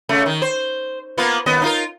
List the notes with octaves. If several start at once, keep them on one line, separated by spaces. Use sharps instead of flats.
C#3 A3
D#3
C5
A#3 B3 F4
D#2 B3 D#5
D#4 F4 A#4